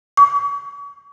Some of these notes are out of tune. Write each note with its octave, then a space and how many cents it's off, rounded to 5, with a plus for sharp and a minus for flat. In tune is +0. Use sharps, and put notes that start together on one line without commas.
C#6 +40